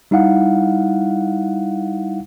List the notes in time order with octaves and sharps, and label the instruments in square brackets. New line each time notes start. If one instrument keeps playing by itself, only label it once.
[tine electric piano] G3 D#4 E4 F5 F#5